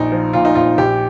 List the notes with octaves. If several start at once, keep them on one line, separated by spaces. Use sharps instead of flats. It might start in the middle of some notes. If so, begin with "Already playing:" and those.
Already playing: A#1 D#4
F3
A#2 F4
D#4
A#1 F4
A#1 G4